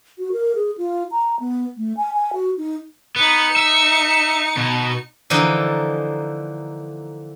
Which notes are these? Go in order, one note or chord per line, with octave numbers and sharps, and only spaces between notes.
F#4
A#4
G#4
F4
A#5
B3
A3
G#5
G#5
F#4
D#4
B3 D#4 C#7
E5
B2
D3 E3 F3 A#3 D#4 A4